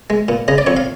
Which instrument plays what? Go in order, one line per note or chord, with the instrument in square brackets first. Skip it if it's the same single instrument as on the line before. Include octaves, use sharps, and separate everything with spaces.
[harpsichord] G#3
A#2
C#3 D#5
D5
F2 C#5
F5